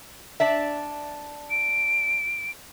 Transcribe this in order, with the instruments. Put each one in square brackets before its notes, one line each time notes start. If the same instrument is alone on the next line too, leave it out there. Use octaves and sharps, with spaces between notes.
[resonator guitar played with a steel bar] D4 D5 E5
[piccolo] D7